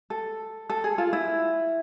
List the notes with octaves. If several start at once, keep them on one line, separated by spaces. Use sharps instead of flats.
A4
A4
G#4
F4
E4